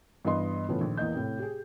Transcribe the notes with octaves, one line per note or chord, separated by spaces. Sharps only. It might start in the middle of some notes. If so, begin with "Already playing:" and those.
G2 E3 B3 D#5 C6
A2 C#3 E3 A3 B3 F4
A#1 D#2
E2 A#3 D#5 G6
A2 C3
G4 G#4